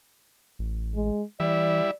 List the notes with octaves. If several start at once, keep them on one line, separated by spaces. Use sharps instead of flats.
A1
G#3
E3 G3 E4 D5 E5